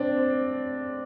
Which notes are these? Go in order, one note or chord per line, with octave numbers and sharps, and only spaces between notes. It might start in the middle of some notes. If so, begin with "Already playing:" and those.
Already playing: C4 D4